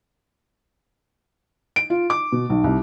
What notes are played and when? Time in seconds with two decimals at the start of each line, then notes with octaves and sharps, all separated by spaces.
1.76 D7
1.90 F4
2.10 D6
2.32 B2
2.50 B1
2.64 C2